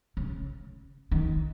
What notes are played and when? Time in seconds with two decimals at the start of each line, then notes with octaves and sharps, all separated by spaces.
0.17 C#3
1.11 D#3